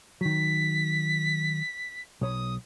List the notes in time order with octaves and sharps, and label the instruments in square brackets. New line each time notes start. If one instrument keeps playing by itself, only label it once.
[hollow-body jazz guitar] D#3 F#3 [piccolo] B6
[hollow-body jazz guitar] B1 C#5 B5 [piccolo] D#6